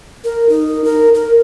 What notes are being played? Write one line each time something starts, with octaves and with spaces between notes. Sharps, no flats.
A#4
D#4
A#4
A#4